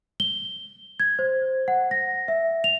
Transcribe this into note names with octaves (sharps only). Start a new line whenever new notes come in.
G7
G#6
C5
F#5
A#6
E5
F7